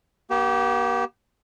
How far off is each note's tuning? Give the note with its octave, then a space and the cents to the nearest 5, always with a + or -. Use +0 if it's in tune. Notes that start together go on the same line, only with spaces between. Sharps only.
A#3 +40 G4 -25